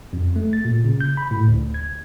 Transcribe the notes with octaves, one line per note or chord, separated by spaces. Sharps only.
F2
A3
A6
A#2
C#3
G6
B5
A2
D2
G#6